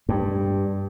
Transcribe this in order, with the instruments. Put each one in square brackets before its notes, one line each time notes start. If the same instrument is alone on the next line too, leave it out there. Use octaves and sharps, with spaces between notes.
[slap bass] G2